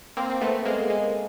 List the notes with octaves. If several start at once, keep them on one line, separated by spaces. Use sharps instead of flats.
A#3 C4
C4
A3 B3
G#3 A#3
G#3